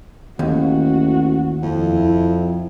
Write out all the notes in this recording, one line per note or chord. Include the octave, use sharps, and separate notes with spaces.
A1 D#2 F#4
F2 E4